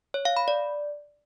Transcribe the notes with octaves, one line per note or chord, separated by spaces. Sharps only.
C#5
F5
B5
D5